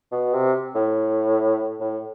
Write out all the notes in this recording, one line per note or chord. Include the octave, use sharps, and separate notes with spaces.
B2
C3
A2
A2